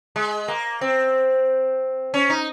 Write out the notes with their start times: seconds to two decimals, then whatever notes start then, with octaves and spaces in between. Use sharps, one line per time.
0.16 G#3
0.48 A#3
0.81 C4
2.14 C#4
2.30 D#4